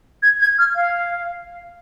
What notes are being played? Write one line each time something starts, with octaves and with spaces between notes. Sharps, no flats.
G#6
G#6
F6
F5